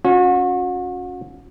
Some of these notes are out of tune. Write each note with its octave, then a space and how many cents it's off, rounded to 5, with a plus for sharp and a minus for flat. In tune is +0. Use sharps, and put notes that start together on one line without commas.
C#4 +0 F#4 -35